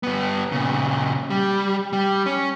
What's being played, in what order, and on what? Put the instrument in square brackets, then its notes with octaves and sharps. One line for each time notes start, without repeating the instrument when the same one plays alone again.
[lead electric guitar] G2 B3
A#2 C#3
G3
G3
C#4